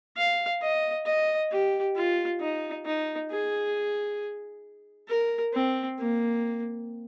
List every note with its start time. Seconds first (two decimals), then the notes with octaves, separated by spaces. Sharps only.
0.17 F5
0.62 D#5
1.06 D#5
1.51 G4
1.96 F4
2.41 D#4
2.86 D#4
3.30 G#4
5.09 A#4
5.53 C4
5.99 A#3